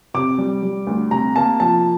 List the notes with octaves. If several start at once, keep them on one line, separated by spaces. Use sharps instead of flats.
C3 D6
G3
G3
D2
C3 A#5
A#3 A5
F3 A5